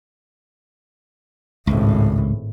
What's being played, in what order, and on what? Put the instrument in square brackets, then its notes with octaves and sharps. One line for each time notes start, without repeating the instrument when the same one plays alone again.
[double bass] G#1 A2 [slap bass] C#2